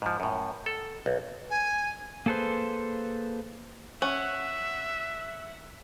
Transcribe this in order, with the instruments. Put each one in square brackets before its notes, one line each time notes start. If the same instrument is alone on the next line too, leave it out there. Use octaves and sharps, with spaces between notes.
[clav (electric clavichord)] G#2 F3
F#2 A2
A4
B1
[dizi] G#5
[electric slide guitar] A#3 G#4 A4 B4 C5
[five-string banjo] C#4 [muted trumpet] E5 [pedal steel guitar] F#5